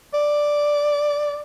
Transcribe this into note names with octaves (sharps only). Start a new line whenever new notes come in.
D5